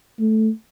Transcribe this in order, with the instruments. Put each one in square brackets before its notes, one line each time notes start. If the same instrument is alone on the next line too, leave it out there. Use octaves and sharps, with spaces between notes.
[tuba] A3